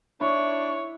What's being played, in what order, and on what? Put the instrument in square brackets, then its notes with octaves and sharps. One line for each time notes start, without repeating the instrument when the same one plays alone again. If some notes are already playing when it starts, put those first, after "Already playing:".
[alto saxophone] D4 [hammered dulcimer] E4 [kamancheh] C#5 [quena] C#6